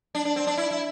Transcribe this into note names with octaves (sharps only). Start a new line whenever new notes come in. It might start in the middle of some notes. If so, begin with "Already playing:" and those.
D4
D4
C4
D4
E4
E4